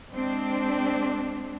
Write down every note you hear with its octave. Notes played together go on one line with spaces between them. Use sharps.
G#3 C4 D4